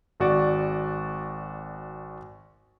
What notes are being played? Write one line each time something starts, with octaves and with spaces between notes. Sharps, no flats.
G#1 F#4 D5